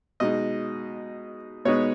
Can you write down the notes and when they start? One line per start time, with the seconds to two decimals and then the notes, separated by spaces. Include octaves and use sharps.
0.20 B2 G#3 D#4 D#5
1.65 B2 G#3 B3 D#4 C#5